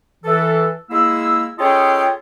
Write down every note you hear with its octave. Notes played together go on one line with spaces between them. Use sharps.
E3 A4
G#3 A#3 E4 E6
C#4 F4 G#4 A4 D#5 G5